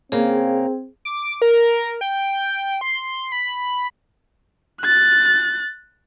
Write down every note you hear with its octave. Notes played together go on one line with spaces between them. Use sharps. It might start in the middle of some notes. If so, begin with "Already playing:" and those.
C#3 A#3 C4 G#4
D6
A#4
G5
C6
B5
F#6 A6